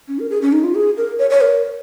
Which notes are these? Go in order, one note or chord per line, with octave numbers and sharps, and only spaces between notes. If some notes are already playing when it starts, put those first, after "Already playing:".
C#4
A#4
G#4
C#4
D#4
F4
G#4
A#4
C#5
C#5
A#4